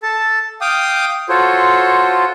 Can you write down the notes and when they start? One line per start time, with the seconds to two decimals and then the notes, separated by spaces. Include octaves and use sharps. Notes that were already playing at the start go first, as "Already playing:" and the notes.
0.03 A4 A5
0.61 F5 G5 D6 D#6
1.29 F4 F#4 A4 C5 C#5